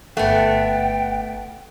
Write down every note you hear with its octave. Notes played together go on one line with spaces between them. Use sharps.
G1 A3 B3 F#5 G5